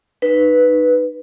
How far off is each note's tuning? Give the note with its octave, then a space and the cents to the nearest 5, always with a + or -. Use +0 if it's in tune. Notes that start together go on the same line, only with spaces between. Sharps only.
D#4 -20 B4 +0